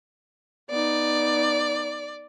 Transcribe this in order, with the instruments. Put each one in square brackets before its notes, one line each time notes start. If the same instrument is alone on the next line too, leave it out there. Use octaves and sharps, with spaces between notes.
[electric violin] B3 D#4 [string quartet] D5